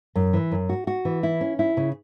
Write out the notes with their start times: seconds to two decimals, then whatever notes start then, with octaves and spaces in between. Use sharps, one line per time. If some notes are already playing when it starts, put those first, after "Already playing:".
0.15 F#2
0.33 E3
0.52 F#2
0.69 F#4
0.87 F#4
1.05 E3
1.23 E4
1.41 C#4
1.59 E4
1.77 C#3